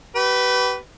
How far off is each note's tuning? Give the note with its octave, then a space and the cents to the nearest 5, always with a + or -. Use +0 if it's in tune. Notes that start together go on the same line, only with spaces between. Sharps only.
G4 -40 B4 +0